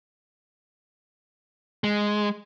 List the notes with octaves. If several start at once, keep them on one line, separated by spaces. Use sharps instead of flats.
G#3